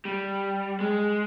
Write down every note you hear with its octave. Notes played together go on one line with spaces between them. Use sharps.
G3
G#3